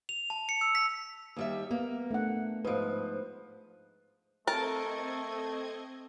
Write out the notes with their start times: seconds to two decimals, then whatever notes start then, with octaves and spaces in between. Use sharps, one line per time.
0.09 F7
0.30 A5
0.49 C#7
0.61 E6
0.75 B6
1.36 D#2 G3 E5
1.71 A#3 B3
2.11 A3 D4 F#5
2.65 G#2 F3 B4
4.47 A3 C4 A4 A#4 D#5 A5 G#6